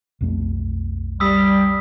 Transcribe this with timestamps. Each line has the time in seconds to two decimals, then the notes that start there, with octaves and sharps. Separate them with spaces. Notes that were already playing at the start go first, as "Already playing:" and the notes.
0.21 B1 F2 A3
1.20 G3 D#6 E6 B6